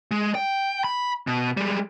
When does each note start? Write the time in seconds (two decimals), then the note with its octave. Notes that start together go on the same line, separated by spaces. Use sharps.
0.11 G#3
0.35 G5
0.84 B5
1.27 B2
1.57 G3 G#3